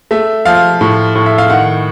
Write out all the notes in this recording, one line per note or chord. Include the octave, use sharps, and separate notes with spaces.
A3 E5
F3 F5
A2
A2
E5
F5
D#3 F#5